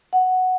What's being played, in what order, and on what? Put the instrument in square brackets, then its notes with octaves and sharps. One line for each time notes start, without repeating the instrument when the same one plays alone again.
[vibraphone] F#5